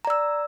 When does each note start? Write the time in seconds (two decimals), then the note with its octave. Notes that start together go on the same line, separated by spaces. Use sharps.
0.05 A#5
0.07 D5
0.10 E6